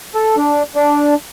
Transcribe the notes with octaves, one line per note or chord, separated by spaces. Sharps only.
A4
D4
D4